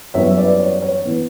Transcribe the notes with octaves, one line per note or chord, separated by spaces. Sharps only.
F#2 E3 G3 B3 C#5 E5
E5
B4 D5
C#5
C#5
E3 B3